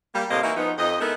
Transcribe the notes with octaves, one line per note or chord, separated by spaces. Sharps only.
G3 A#3
A2 C3 A#3 C5 D#5
E3 A#3 D#4 F#4 E5
F3 B3 D#4
F2 D#5
G#3 B3 D#4 E4 A4 A#4